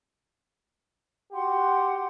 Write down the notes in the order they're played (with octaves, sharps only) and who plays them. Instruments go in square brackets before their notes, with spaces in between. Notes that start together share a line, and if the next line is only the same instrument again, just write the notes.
[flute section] F#4 F#5 C6 [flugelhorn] G4